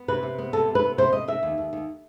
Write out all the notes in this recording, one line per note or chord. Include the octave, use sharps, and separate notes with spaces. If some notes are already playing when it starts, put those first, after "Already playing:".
Already playing: B3
C3 B4
C3
B3
C3 A4
C3
B4
B3
C3 C5
C3 D#5
C3 E5
D#2
D#2
D#2